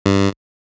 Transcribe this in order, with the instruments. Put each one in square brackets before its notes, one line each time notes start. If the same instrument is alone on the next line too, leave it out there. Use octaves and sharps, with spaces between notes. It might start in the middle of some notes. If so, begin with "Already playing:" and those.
[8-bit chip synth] G2